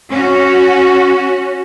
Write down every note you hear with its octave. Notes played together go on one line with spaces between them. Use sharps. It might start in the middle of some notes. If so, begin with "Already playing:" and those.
C#4 F#4